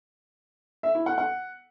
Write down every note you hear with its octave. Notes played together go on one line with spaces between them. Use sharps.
E5
E4
F#5
F#5